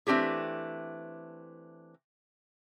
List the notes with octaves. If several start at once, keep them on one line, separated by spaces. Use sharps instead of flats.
E3 A3 C4 D4 G4 G#4